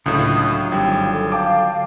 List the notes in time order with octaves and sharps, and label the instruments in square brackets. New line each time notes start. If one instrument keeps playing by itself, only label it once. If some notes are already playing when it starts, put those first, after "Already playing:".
[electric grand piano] C#2 A2 [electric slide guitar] D3 F#3 F4 [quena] D#6
[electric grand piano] G#1 G3 [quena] G5
[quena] A4
[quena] F5 [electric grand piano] G5 A5 D6